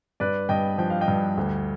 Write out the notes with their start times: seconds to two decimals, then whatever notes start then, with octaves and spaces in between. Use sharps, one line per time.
0.20 G2 B4 D5
0.49 G2 D#5 G5
0.78 F3 G5
0.90 F5
1.01 D#5 G5
1.08 G2
1.37 D2